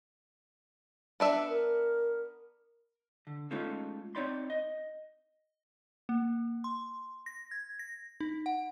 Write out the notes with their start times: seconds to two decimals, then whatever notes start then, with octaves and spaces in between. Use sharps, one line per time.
1.20 B3 D4 E5
1.49 A#4
3.27 D3
3.51 G#3 A3 C#4 D#4 F4 A4
4.15 C4 D#4 C#5 D5 B5 C6
4.50 D#5
6.09 A#3
6.64 C6
7.26 A#6
7.51 G#6
7.79 A#6
8.20 D#4
8.46 F#5